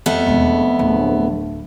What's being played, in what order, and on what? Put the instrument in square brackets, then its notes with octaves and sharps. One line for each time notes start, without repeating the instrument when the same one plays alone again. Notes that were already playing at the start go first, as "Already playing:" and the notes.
[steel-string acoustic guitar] F2 A3 B3
[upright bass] E1 D#2
D1